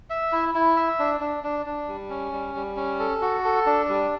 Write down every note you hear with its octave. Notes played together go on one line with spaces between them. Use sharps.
E5
E4
E4
E5
D4
D4
D4
D4
G3
C#4
G3
G3
C#4
A4
F#4
A4
D4
G3